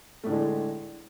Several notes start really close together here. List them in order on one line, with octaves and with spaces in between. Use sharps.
A3 A2 D3 G#3